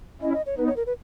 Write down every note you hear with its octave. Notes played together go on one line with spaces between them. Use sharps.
C#4 E4 D#5
D#5
C#5
B3 D#4 B4
C#5
A#4
B4